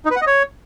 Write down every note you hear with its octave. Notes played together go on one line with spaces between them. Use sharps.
D#4
B4
F#5
D#5
C#5